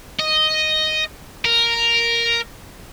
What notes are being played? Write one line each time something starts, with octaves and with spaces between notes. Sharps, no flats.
D#5
A#4